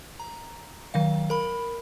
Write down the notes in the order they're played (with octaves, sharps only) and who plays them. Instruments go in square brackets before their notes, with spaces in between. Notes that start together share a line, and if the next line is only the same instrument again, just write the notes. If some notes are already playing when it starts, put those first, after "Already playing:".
[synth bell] A#5
D#3 F#3 F5
A#4 B5